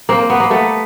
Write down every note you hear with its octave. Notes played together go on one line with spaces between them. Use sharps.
A#3 C4
B3
A#3
A3 B3